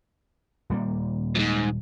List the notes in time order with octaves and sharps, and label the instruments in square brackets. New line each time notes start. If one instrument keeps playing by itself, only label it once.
[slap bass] D#1 G3 A#3
[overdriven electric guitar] F2 G#2